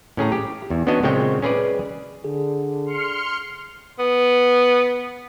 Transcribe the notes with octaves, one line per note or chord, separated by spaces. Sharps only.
A2 C#4 G#4 A#5
G4
E2
B3 C#4 D4 F#4 D#5
A#2 C#3 G#3 C4 C#5 G5
C#4 G#4 B4 D5
D3 G#4
C6 F6 C#7
B3